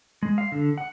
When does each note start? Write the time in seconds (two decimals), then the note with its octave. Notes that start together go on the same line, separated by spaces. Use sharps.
0.23 G#3
0.38 F5
0.52 D3
0.78 F#5